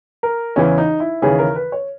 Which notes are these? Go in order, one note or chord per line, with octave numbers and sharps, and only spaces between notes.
A#4
E2 C#3 E3 C#4
D#4
E4
D#2 C#3 E3 G#4
A#4
B4
C#5